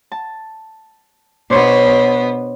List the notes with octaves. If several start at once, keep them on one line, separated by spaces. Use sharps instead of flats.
A5
B2 B3 D4 C5 C#5